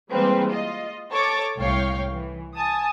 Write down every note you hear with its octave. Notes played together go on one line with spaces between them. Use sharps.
E3 G3 G#3 A#3 C4 B4
F4 D#5
A4 C#5 A5 C#6 D6 A6
C2 A2 C#5 F5 G5
E3
G#5 A5 D#6